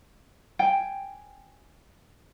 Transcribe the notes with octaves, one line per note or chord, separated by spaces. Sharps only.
G5 G#5